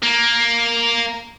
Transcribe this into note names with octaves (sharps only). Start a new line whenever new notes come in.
A#3